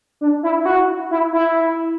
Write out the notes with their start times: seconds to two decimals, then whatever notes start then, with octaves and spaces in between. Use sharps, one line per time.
0.21 D4
0.43 E4
0.60 E4
0.66 F#4
1.11 E4
1.33 E4